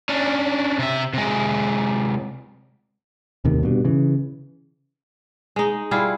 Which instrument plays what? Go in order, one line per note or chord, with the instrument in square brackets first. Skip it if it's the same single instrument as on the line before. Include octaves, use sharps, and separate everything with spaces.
[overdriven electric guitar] C#4 D4
C3 E5
C3 G#3
[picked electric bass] D#2 A2 C3 D#3
G2 B2
C#3 E3
[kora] G#3 D#4
G3 E4 F4 G#4